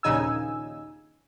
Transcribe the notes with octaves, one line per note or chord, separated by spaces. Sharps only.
A#1 D#2 C#3 D#4 G#5 E6